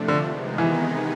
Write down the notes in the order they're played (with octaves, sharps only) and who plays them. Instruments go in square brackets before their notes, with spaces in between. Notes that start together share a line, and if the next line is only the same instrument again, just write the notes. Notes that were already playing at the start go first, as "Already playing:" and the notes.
Already playing: [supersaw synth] C3 F3 A3 D4
[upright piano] D3
[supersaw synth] C3 D#3 G#3 B3 D#4
[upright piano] E3